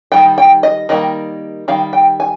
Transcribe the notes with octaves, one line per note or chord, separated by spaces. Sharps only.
D#3 G3 G5
G5
D#5
D#3 G3 A#3 D#5
D#3 G3 F5
G5
G#5